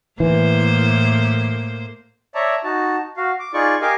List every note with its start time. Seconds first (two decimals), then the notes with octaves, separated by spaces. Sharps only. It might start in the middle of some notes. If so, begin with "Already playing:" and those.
0.20 A2 E3 A#3 C5
2.35 C#5 D5 E5 A5 A#5
2.64 D#4 F#4 A5
3.17 F#4 F5
3.39 D6
3.54 D#4 F4 G#4 D5 C#6
3.81 G4 A#4 D#5 F5 G#5 D6